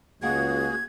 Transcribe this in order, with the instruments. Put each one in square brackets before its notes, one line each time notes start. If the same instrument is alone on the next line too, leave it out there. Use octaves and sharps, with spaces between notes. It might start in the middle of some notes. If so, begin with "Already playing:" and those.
[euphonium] C#2 [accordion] G#3 F#4 G#4 [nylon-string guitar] A#3 F#5 [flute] G#6